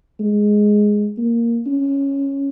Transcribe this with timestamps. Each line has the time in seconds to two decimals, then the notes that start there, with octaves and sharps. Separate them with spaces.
0.20 G#3
1.18 A#3
1.67 C#4